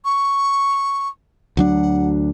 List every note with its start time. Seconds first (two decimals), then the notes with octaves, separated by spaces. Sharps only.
0.05 C#6
1.57 D2 F#3 D4 F#5